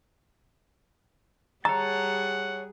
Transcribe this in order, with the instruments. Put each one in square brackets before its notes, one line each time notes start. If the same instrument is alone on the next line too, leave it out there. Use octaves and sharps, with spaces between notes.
[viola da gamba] G3 G#4 [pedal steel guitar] C#5 A5 [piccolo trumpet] F#5 [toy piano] A#5